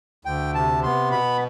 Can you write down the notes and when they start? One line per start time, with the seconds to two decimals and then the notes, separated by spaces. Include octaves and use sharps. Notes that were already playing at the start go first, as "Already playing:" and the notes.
0.25 D2 G5
0.54 C3 A5
0.83 B3 C6
1.11 B2 B5